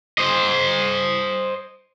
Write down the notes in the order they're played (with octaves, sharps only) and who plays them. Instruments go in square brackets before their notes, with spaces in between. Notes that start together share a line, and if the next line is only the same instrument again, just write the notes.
[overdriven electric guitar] C5 D#5